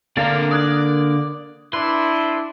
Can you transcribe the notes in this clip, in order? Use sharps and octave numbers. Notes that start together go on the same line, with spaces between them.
D3 A#3 C4 D4 A#4 F5 A#5 A6
D5 D#6 F#6 G#6
D4 E4 B4 C6